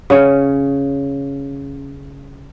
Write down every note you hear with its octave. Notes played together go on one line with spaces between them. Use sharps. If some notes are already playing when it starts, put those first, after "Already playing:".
C#3 C#4 C#5